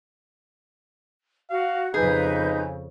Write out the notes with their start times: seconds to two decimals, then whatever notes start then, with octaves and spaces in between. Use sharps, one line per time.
1.50 F#4 F5
1.94 F2 C#3 D#4 G#4 B4 G6